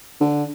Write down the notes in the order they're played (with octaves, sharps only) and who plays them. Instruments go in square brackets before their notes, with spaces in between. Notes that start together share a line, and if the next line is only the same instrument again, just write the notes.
[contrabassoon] D3